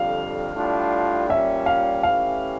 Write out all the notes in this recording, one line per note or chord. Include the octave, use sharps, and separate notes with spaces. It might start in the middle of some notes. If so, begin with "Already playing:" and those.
Already playing: F2 D3 G3 F5
A2 G3 D4 F4
A#2 G3 C#4 E5
F5
E3 A3 C#4 G4 F5